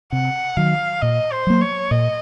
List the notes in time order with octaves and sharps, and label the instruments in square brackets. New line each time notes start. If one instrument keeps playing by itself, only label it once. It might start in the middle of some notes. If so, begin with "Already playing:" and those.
[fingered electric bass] C3 [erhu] F#5
[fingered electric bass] D#3 F#3 [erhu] F5
[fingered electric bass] A#2 [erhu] D#5
[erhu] C5
[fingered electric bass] F#3 A#3
[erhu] C#5
[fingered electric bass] A#2 [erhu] D#5